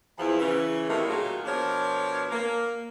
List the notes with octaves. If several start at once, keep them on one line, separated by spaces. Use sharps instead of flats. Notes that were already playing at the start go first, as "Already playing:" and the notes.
E2 F3 E4
C#3 E3 C#4
A2 C3 D#3 A3 A#3
A#2 D#3 F#3 F4 F#4 G#4
B2 F3 D4 A#4 C#5
A#3